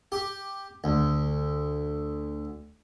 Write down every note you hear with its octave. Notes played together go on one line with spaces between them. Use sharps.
G4
D2